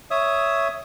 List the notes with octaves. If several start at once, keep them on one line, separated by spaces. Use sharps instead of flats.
C#5 E5 D#6